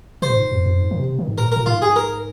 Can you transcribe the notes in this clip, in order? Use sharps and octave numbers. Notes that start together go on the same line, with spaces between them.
C3 C5
A#2
G#2
F2
F2
G#2
D#3
C3
D#3
G#2
A#2 A#4
A#2 A#4
G#2 F4
G#4
A#4